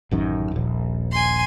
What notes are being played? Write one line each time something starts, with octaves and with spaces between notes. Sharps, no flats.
A1 F#2 D#3
D#1 A#1
G#5 C6